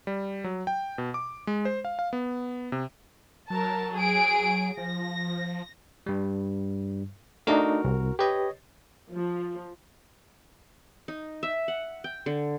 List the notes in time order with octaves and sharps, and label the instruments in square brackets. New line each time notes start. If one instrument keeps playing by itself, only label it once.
[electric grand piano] G3
F#3
G5
B2
D6
G#3
C5
F5
F5
B3
C3
[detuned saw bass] F#3 [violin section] A#4 A5
[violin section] G#4 D7
[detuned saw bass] F3 [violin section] A#6
[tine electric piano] G2 G3
[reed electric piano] A3 D4 D#4 [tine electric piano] F#4 A#4
[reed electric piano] C2
[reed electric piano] G4 B4 [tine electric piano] C#5 D#5
[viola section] F3
[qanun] D#4
E5
F#5
G5
D3